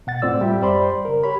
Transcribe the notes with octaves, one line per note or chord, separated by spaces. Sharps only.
B2 F#5 A6
A2 C4 F4 D5 E6
G3 G4 E5 G5
F#2 G3 C5 D5 B5 C6
C#3 A#4
G4 C#5 B5